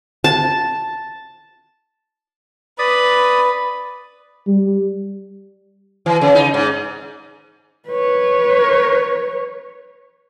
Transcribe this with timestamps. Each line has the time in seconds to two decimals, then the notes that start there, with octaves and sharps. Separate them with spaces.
0.24 A5
2.79 B4 D5 B5 D#6
4.47 G3
6.06 E3
6.21 C#3
6.35 D#4
6.54 G#2
7.88 B4 C#5